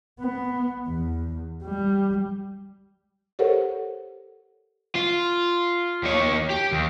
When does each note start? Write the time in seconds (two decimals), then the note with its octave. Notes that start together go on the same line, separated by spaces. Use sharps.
0.20 B3
0.87 E2
1.64 G3
3.39 G4 A4 A#4 C5 C#5 F#5
4.95 F4
6.03 D#2 C#5
6.50 G4
6.72 D#2